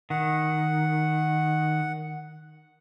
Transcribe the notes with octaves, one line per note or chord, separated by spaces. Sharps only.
D#3 F#5